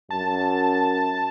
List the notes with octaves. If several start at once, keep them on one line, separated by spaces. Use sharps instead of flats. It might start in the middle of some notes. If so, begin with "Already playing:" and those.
F#2 A5